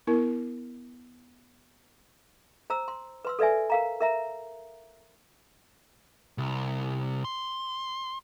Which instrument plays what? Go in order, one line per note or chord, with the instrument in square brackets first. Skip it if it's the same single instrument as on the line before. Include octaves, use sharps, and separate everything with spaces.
[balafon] B3 E4 A#4
[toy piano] C5 A#5 E6
C6
B4 C6 E6
A4 B4 D5 E5 G#5
A#4 F5 A#5
A#4 E5 A#5
[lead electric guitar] C2
C6